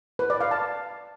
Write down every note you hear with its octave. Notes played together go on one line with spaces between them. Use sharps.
B4
D5
F5
A5